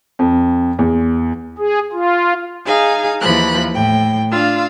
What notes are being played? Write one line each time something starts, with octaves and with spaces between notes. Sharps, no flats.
F2
E2
G#4
F4
D#4 G#4 F5 G#5
D#2 E3 F3 B5 F#6
A2 G5
D4 F4 F5 E6